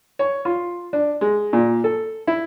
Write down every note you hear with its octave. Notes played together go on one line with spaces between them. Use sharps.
C#5
F4
D4
G#3
A#2
A4
E4